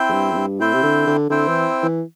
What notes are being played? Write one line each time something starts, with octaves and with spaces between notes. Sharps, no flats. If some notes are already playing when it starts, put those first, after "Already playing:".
Already playing: C4 E4 C5 G5
E2
G2
E2
G2
A2 C4 E4 C5 G5
C3
D3
D3
D3 C4 E4 C5 G5
E3
E3